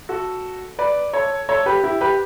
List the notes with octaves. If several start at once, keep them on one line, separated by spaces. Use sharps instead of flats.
F#4 A4
B4 D5
A4 C#5
A4 C#5
G4 B4
E4 G4
G4 B4